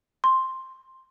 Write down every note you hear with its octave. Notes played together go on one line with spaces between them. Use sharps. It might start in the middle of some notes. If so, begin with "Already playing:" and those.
C6